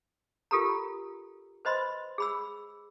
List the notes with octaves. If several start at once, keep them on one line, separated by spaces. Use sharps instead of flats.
F4 G4 A4 A#4 A#5
B4 C5 D#5 B5 C6
G#4 B5 E6